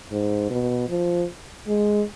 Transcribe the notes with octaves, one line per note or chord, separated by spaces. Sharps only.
G#2
B2
F3
G#3